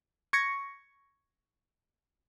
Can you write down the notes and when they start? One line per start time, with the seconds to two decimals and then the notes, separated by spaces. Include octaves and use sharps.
0.33 C#6 G#6 A#6 C#7